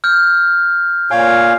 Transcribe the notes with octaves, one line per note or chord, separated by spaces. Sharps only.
F6 G6
A#2 C#5 F5 G#5